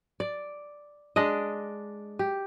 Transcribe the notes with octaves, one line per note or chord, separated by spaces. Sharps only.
D5
G#3 D4 D5 D#5
G4